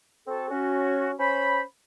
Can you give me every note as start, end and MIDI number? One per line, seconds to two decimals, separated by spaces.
0.27 0.48 60
0.27 0.48 66
0.27 0.48 69
0.50 1.12 61
0.50 1.12 66
1.19 1.61 61
1.19 1.61 72
1.19 1.61 83